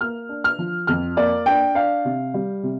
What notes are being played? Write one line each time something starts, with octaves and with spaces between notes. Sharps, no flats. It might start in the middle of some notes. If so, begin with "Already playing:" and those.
A#3 F6
D4
F6
F3
F2 F6
A#3 D5
D4 G5
D4 F5
C3
G3
C3